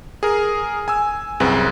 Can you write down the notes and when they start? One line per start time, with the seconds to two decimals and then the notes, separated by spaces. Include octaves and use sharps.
0.23 G#4 A#4
0.88 G#5 E6
1.40 C2 F#2 C4 G#4 B4 F#6